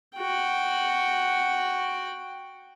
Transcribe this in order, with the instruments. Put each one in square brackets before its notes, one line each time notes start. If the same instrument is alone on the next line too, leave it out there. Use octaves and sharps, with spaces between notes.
[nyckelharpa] F#4 G5